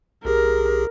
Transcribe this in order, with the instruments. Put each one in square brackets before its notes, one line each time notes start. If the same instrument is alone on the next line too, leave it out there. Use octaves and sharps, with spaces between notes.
[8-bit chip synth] B1 G4 G#4 [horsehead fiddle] A#4